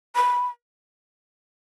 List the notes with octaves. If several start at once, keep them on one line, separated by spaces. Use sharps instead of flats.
B5